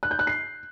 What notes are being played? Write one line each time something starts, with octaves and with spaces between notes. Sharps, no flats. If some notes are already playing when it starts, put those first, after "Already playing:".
F#6
G6
F#6
C7